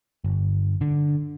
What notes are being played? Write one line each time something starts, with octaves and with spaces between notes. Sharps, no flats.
G1
D3